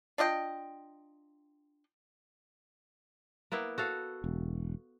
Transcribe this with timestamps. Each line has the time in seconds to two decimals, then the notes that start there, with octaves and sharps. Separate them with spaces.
0.18 D4 F4 D#5 G5
3.52 A#3 B3 E4
3.78 F#4 A4 F5
4.24 E1